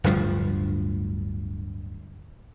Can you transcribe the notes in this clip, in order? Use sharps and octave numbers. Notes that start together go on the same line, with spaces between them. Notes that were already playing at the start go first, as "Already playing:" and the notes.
D1 D2 G2 F3